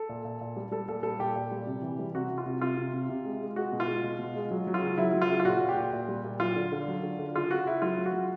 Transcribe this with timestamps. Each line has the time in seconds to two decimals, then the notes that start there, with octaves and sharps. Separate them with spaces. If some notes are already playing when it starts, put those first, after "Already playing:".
Already playing: A4
0.09 A#2
0.25 A#2
0.41 A#2
0.57 G3
0.71 G3 A4
0.88 A#2 A4
1.03 G3 A4
1.19 A#2 G4
1.35 A#2
1.51 G3
1.67 C3
1.82 E3
1.99 G3
2.15 C3 F#4
2.30 C3
2.38 F4
2.46 C3
2.61 C3 F4
2.78 C3
2.94 C3
3.09 C3
3.25 G#3
3.41 G#3
3.56 G#3 F#4
3.73 B2
3.80 F4
3.88 G#3
4.03 B2
4.19 B2
4.36 G#3
4.51 F#3
4.67 F#3
4.74 F4
4.82 C#3
4.98 F#3 E4
5.13 F#3
5.22 F4
5.29 C#3
5.40 F4
5.45 A#2 F#4
5.61 A#2
5.69 G4
5.77 A#2
5.93 A#2
6.08 G3
6.24 A#2
6.40 F#3 F4
6.55 D3
6.72 D3
6.88 F#3
7.03 D3
7.19 D3
7.35 C#3 F4
7.51 C#3 F#4
7.66 C#3 E4
7.82 F#3 F4
7.98 F#3
8.06 F#4
8.13 F#3